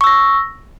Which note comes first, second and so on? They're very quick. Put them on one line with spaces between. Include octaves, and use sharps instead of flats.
C#6 E6 A#6